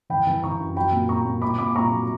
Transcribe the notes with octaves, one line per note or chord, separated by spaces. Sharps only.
E3 G5 B5
E3
E3 A#5 C#6
F#2
F#3 G5 B5
A#2
A#2 A#5 C#6
A#2
A#2 B5 D6
A#2 B5 D6
A#2 A#5 C#6
F#3